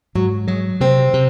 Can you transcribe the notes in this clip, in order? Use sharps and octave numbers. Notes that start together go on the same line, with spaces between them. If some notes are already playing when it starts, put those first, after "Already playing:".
G#2 F#3
F#3 G#3
C3 C4
C3